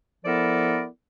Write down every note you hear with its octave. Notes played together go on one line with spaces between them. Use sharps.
F3 B3 E4 A4 A#4 D5